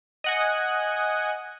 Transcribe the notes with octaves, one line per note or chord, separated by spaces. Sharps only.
D#5 F#5 G#5